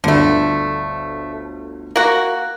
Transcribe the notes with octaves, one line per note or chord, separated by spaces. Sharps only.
G1 D2 D3 A3
A#3 F#4